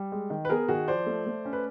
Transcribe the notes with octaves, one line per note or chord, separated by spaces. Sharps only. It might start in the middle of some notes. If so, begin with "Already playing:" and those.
Already playing: G3
G#3
D#3
B4
B3 G#4 A#4
D#3 F#4 G#4
F3 C5 D5
A3
A3
C#4
B4